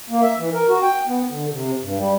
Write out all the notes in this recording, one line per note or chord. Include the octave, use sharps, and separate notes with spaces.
A#3
E5
E3
A#4
F#4
G5
B3
D3
C3
G2
G3